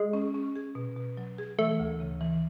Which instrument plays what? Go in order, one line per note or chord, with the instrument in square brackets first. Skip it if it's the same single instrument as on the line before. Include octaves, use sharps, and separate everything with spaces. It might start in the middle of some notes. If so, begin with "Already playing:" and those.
Already playing: [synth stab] G#3
[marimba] C#4
C#4
G#4
B2
B2
F#3
G#4
[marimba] E3 [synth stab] A3
[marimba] D2
C#3
E3